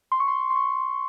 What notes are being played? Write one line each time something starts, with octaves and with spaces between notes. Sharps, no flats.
C6
C#6
C6
C6
C#6